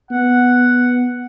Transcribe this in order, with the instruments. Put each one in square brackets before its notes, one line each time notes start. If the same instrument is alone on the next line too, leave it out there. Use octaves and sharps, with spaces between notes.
[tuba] B3 [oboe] F#5